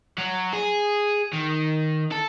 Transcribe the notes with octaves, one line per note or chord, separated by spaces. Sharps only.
F#3
G#4
D#3
A4